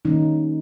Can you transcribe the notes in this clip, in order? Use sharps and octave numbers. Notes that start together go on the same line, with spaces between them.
D#3 G3 A#3 C#4 D#4